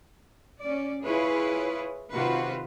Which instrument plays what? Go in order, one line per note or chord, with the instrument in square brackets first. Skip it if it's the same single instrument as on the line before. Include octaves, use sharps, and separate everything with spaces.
[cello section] C#4 D5
E4 F4 G#4 B4 C#5
C3 D#3 F4 F#4 B4 C5